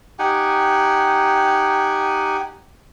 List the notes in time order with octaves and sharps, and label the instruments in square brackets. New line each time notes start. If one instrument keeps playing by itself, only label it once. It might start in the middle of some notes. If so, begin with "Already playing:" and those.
[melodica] D#4 G4 F#5 G#5